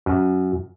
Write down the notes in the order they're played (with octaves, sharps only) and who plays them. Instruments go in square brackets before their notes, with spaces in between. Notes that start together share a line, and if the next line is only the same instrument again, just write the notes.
[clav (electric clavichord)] F#2